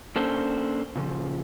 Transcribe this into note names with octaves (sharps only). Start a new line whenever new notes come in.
A#3 C#4 D4 A4 C5
A#2 C#3 F3